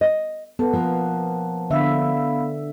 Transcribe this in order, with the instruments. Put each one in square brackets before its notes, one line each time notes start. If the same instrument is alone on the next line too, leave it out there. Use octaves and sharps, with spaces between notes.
[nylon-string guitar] D#5
[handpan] B3 [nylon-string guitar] A4 [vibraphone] A5
[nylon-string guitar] F3 A#3 F4
[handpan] D3 E5 [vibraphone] B3 F5 B5